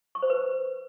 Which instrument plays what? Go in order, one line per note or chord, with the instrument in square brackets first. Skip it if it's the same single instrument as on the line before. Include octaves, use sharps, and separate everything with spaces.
[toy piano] C#6
C5
B4